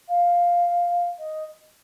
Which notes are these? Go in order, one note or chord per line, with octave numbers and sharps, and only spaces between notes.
F5
D#5